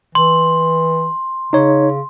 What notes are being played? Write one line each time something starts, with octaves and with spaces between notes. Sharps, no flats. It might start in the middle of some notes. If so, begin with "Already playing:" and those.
E3 C6
C#3 D#4 C#5